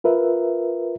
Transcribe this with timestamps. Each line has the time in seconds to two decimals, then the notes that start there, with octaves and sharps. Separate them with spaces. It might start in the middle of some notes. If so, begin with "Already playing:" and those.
0.04 F4 A#4 B4 E5